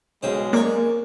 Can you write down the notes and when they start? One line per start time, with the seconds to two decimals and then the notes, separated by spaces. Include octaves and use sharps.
0.23 B1 C#3 G#3 C5
0.53 A#3 A#4 C#5 D5